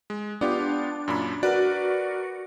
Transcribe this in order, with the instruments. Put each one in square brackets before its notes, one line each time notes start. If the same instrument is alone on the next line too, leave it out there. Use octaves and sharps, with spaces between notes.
[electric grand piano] G#3
[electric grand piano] B3 F4 G4 [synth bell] D4
[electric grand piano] F#2 A#2 B5
[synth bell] F#4 [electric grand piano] A#4 B4 D5